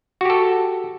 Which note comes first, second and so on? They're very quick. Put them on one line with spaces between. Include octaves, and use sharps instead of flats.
F#4 G4 A4